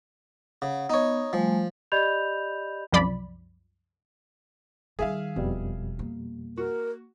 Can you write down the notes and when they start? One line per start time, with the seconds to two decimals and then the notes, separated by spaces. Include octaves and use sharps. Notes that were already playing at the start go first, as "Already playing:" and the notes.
0.62 C#3 F#5
0.90 B3 D#4 C#5
1.33 F3 G3 A3 G#5
1.92 G4 D5 D#5 B5 G6 F7
2.92 C2 F#2 F3 D5 B5
4.99 D#3 G3 G#4 E5 F5
5.36 E1 F2 B2 G3
5.99 A#3
6.58 F#4 A#4